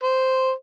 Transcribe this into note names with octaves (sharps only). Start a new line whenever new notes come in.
C5